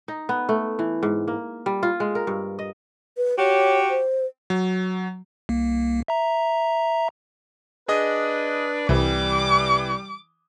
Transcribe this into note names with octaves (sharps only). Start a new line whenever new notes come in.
D#4
B3
A3
E3
G#2
A#3
G3
F4
G#3
A#4
G2
D#5
B4
F#4 G4 C#5
C5
F#3
C2 A#3
E5 A#5
D4 G#4 B4 D#5 D#6
C2 E3 G3 D6